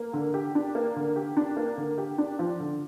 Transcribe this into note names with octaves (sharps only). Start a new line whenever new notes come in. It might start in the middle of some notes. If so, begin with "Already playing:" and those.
Already playing: A#3
D3
G4
D4
A#3
D3
G4
D4
A#3
D3
G4
D4
F3
D3